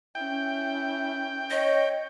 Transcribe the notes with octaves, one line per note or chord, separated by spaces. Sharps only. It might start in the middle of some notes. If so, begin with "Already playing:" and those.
C#4 E4 G5
C#5 D#5